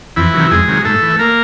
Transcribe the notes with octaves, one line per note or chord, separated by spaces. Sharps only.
F2 E3 E4
C3 D#3 F#3
F2 G#3 G#4
C3 D#3 F#3
G#2 A3 A4
E3
A#3 A#4